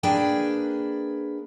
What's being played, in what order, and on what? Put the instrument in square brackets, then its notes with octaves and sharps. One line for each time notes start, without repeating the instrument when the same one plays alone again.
[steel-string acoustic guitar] A#3 D4 G#4 B4 G5